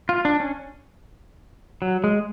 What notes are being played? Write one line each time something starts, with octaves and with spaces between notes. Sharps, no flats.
F4
D4
C#4
F#3
G#3